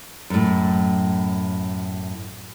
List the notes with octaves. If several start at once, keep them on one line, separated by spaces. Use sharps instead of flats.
F#2 A2